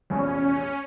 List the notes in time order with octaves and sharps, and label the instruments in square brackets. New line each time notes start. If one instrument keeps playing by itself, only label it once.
[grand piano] F1 A#1 E2 [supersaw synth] C#4